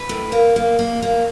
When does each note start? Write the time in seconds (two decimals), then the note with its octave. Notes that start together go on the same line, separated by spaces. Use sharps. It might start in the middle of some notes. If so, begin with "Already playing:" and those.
Already playing: B4
0.09 A2
0.32 A#3
0.56 A#3
0.79 A#3
1.02 A#3